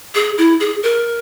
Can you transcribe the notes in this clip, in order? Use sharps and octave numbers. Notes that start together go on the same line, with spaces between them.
G#4
E4
G#4
A#4